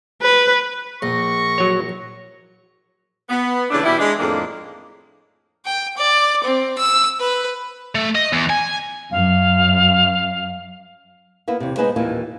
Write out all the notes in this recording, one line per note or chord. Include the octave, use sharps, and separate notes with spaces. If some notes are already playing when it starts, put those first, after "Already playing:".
B4
A#1 C#6 A#6
F#3 C#5
B3
C#3 E3 A3 D4
B2 E3 G3 E4
G#3 D4
F2 A2 D#3 G#3 A#3 D4
G5
D5
C4
E6
B4
A3
D#5
E2
G#5
F#2 F5
A#3 B3 E4
E2 C3
G#3 B3 D#4 G#4 B4 C5
D#2 A#2 E3